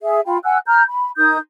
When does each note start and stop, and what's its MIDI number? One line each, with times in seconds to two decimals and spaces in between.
0.02 0.20 68
0.02 0.20 76
0.26 0.38 65
0.26 0.38 79
0.26 0.38 83
0.44 0.58 78
0.44 0.58 80
0.44 0.58 88
0.44 0.58 90
0.66 0.83 82
0.66 0.83 89
0.66 0.83 91
0.88 1.10 83
1.18 1.37 63
1.18 1.37 70
1.18 1.37 87
1.18 1.37 91